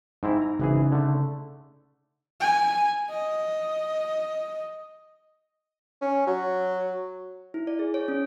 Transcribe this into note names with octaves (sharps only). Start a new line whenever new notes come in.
G#2 C4 D#4 E4
A#5
G#1 C#3 E3 G#4
D3 A3
G#5
D#5
C#4
F#3
E4
D5
G#4
C#5
C#4